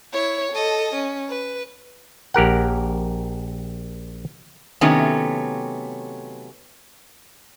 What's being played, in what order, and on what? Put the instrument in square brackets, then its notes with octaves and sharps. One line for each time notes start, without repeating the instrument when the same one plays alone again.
[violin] E4 C#5
A4 D#5
C#4
B4
[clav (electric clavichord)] A#1 G4 A#4 F#5
[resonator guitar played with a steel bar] C3 D#3 F#3 A3 B3 C#4